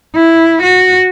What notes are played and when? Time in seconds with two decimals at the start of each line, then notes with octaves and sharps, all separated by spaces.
0.15 E4
0.63 F#4